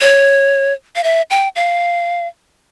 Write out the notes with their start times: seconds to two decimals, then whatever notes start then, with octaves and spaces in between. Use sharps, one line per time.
0.01 C#5
0.96 F5
1.04 E5
1.30 G5
1.56 F5